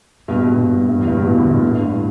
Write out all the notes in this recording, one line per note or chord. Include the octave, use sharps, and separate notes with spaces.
G2 B2
G2 B2
G2 B2
G2
G2
E2
G2
E2 A2
G2 B2
A2 D3
G2 B2
G2
G2
A2